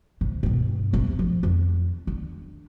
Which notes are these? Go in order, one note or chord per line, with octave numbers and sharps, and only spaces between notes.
C3
G2 B2
F1 C2
F3
F2
D3